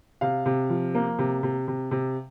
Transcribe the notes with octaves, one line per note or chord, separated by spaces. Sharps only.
C3 F5
C3
F3
A#3
C3
C3
C3
C3